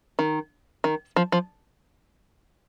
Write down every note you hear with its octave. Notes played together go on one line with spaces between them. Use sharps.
D#3
D#3
F3
F3